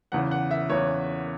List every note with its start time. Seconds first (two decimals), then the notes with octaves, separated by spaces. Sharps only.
0.12 E2 C#3 E3 F#5
0.31 F#5
0.51 E5
0.69 E2 C#3 E3 C#5